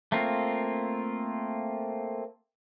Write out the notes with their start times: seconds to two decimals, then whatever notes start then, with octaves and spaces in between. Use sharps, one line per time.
0.12 A3 A#3 C4 F4